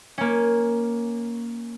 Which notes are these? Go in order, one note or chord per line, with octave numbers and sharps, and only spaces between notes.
A#3 C#4